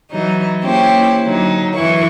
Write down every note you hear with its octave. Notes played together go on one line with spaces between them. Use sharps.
E3 F#3 D#4
A#3 C#4 E4 G4 C5
D3 F#3 D#4
F#2 E3 E4 C#6